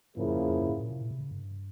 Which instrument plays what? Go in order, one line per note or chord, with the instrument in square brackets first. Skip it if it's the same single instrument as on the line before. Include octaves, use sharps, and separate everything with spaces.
[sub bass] G#2 [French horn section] C#3 F3 A#3 E4 G#4
[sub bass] F2
E2
F2
G2
G#2
A#2
C3
A#2
C3
C#3
G2